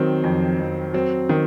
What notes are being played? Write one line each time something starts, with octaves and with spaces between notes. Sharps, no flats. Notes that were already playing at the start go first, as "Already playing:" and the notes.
Already playing: D#3 F#3 C4
F2
F2
F#3 C4
D#3